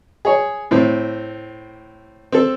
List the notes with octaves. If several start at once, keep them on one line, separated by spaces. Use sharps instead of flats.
G#4 C#5
A2 C4
C4 A4